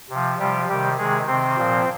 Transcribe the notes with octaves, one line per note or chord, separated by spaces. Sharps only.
C3 F3
C3 F3 G3 G4
C3 D#3 G3 G4
C3 D#3 G#3 G#4
C3 D#3 C4 C5
A#2 F3